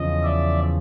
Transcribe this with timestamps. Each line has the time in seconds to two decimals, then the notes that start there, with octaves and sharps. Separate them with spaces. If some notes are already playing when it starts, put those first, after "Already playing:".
Already playing: E2 C#3 F3 D#5
0.23 D5 E5